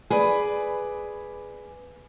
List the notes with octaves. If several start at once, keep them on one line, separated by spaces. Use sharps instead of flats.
G#4 B4 D5